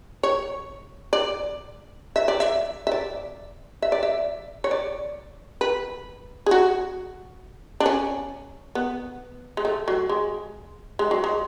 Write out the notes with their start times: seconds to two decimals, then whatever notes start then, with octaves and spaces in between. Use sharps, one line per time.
0.23 C#5
1.13 D5
2.16 E5
2.28 D5
2.40 E5
2.87 E5
2.92 D5
3.82 E5
3.92 D5
4.03 E5
4.64 C#5
4.71 D5
5.61 B4
6.46 G#4
6.51 F#4
7.80 D4
7.86 C#4
8.75 B3
9.57 G#3
9.65 A3
9.88 F#3
10.09 G#3
10.99 G#3
11.11 F#3
11.24 G#3